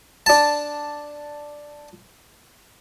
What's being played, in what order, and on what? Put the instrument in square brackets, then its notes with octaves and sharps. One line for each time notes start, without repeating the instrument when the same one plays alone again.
[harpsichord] D4 A5